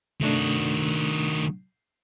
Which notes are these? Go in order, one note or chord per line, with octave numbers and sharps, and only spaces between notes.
C3 D#3 A3 D4 F#4